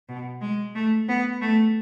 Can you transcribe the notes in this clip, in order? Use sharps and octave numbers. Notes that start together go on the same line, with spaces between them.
B2
G#3
A3
B3
A3